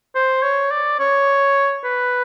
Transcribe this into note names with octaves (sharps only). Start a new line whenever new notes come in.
C5
C#5
D5
C#5
B4